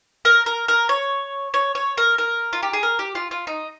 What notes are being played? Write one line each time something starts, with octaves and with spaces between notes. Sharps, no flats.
A#4
A#4
A#4
C#5
C#5
C#5
A#4
A#4
F4
G4
G#4
A#4
G4
F4
F4
D#4